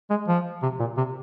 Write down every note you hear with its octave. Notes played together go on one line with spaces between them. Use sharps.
G#3
F3
C3
A#2
C3